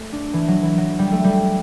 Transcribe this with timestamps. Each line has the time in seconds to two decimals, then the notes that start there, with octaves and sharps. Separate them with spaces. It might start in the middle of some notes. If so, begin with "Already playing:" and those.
Already playing: A3
0.13 D4
0.33 E3
0.48 F#3
0.63 E3
0.78 F#3
0.99 G3
1.12 A3
1.24 G3